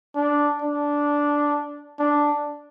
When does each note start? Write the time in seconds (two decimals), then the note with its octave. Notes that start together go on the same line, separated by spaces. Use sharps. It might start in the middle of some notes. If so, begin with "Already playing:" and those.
0.16 D4
0.62 D4
1.99 D4